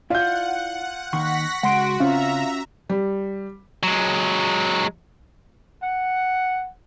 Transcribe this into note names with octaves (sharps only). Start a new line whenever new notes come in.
E4 F4 D5 E5 F#5 G6
D#2 D#3 F#5 C6 C#6 A#6 B6
C#3 G#3 F#4 F#5 C6 D7
C#3 C4 C#4 F4 E5 A#5
G3
F#3 G#3
F#5